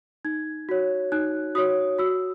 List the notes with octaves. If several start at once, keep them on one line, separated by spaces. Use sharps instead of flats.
D#4 G#6
F#4 C#5
D#4 F#6
F#4 C#5 D#6
F#4 E6